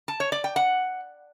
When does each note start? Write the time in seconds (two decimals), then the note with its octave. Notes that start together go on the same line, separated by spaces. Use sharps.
0.08 A5
0.20 C#5
0.32 D5
0.44 G5
0.56 F#5